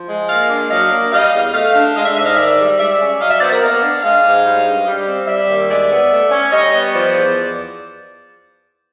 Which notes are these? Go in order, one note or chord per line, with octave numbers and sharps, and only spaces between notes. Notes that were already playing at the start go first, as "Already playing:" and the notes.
Already playing: F3
G#3
A#3 D#5 F5
D4
F#3 D#5 F5
A#3
G3 D#5 F5
E2
A3 D#5 F5
D4
G#3 D#5 F5
D5 E5
G#2 D5 E5
D#5 F5
D#3 D5 E5
G3
G#3 D5 E5
C#4
F#3 D#5 F5
D5 E5
B3 C5 D5
A#4 C5
A#3 D#5 F5
D4
G#3 D#5 F5
G#2
G3
G2
G3
C4
G3 D5 E5
D#2
G#3 D5 E5
B3
A3
C#4
G3 C#5 D#5
B3
F3 C5 D5
E2